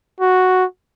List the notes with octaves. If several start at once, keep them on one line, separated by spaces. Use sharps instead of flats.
F#4